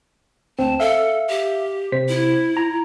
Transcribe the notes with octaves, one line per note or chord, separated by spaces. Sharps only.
D2 C4 A5
A4 E5 F5
G4
C3 C5 B6
E4
A#5